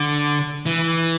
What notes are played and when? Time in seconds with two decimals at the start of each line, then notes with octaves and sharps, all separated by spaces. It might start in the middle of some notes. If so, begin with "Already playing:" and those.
Already playing: D3
0.66 E3